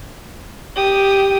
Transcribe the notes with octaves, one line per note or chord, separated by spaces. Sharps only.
G4 D#6